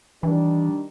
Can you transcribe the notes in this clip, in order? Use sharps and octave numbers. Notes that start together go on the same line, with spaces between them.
D#3 E3 G3 D4